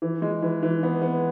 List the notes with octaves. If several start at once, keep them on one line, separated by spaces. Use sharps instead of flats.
E3
G#3
E3
E3
B3
B3